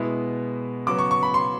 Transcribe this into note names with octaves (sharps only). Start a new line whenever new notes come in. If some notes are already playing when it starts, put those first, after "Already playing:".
Already playing: B2 G#3 B3 E4
C#3 F#3 B3 D6
C#6
C#6
B5
C6